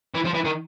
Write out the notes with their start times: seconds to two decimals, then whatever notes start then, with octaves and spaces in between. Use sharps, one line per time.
0.14 E3
0.25 F3
0.34 E3
0.45 D#3